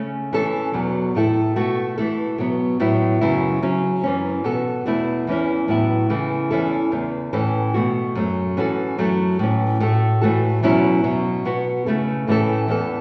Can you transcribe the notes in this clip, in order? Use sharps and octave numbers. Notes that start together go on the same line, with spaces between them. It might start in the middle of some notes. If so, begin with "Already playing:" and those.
Already playing: C#3 A3 C#4
E3 C#4 A4
E2 B2 F#3
A2 A3 E4 A4
B2 A3 F#4 A4
E3 A3 E4 A4
B2 F#3 B3
A2 F#3 B3 E4
F#2 C#3 F#3 B3 E4
C#3 F#3 C#4
F#2 E3 C#4
B2 B3 F#4 A4
E2 B2 A3 E4
E2 E3 C#4 E4
A2 F#3 B3 E4
C#3 E3 A3
E2 E3 C#4 E4 A4
E2 C#3 A3
A2 E3 C#4 A4
B2 A3 F#4
F#2 F#3 A3
E3 C#4 F#4 A4
F#2 F#3 A3 E4 A4
A2 E3 C#4
A2 A3 F#4 A4
A2 E3 A3 F#4 A4
E2 B2 F#3 C#4 E4
B2 F#3 C#4
B2 B3 F#4
C#3 A3 E4 A4
A2 E3 A3 C#4 A4
E2 E3 B3 A4